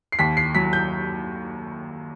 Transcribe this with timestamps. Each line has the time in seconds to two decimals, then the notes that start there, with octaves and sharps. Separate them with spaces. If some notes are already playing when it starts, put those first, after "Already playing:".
0.12 C7
0.19 D#2 B6
0.37 C7
0.55 F#3 B6
0.73 G6